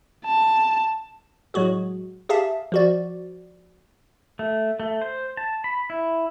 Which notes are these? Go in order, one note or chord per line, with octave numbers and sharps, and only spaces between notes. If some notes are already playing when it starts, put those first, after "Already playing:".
A5
A2 F#3 G#3 F#4 G#4
G4 G#4 E5 F5 A5
F3 F#4 D5
A3
A3
C5
A5
B5
E4